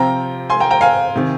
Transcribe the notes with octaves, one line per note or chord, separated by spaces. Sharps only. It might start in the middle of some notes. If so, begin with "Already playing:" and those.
Already playing: C3 F3 C4 F4 G5 A#5
G#5 C6
G5 A#5
G5 A#5
F5 G#5
C3 D#3